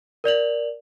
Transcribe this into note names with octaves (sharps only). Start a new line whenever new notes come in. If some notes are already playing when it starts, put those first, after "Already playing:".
A#4 D5 F7 F#7